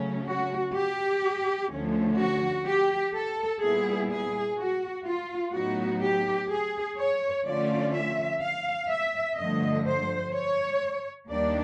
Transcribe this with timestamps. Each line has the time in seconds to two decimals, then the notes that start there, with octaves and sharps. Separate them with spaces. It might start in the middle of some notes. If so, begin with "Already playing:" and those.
Already playing: C#3 F#3 A3 C#4
0.26 F#4
0.74 G4
1.70 D2 D3 F3 A3 C#4
2.18 F#4
2.66 G4
3.14 A4
3.61 A#2 G3 B3 E4 G#4
4.10 G#4
4.57 F#4
5.06 F4
5.54 A2 F#3 B3 D#4 F#4
6.02 G4
6.49 G#4
6.98 C#5
7.45 D3 F3 A3 C#4 F4 D5
7.93 E5
8.41 F5
8.89 E5
9.37 G2 D3 F3 A3 D#5
9.85 C5
10.33 C#5
11.29 D#2 D#3 G3 A#3 D4 D5